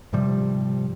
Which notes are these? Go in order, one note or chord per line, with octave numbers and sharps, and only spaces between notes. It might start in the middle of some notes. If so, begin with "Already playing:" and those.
G#2 C3 F3 G3